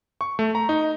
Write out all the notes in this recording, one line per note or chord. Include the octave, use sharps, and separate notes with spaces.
C#6
A3
A#5
D#4